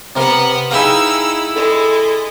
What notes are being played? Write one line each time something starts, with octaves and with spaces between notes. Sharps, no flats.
C3 B3 A#4 F#5
D#4 E4 G#4 F5 G5 G#5 E6
G#3 A4